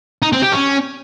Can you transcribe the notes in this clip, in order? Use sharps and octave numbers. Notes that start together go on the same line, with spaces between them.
D#4
C4
G4
C#4